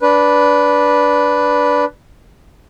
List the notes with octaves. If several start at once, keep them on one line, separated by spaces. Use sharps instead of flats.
D4 B4